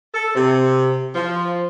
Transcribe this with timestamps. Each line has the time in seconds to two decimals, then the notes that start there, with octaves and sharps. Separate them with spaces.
0.14 A4
0.35 C3
1.15 F3